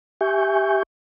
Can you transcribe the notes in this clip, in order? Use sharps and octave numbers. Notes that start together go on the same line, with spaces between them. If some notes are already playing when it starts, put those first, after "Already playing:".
G4 E5 G#5 C#6 G6